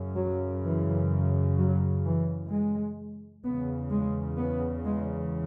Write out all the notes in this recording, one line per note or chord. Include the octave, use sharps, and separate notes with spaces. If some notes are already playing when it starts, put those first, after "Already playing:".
Already playing: F#2 C#3
F#3
E3
F#3
E3
G#3
E2 C#3 B3
G#3
B3
G#3